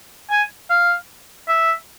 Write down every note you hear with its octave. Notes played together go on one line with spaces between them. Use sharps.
G#5
F5
E5